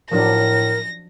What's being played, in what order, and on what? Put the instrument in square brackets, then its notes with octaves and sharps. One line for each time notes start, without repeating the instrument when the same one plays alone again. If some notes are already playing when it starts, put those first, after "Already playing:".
[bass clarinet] A2 [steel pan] F3 F#3 D4 [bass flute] A#4 [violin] A#6